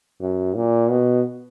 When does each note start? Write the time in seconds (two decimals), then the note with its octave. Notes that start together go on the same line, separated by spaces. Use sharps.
0.21 F#2
0.56 A#2
0.90 B2